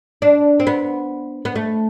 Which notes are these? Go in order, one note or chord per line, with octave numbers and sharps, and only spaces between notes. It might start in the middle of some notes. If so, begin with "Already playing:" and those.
D4
C4
B3
B3
A3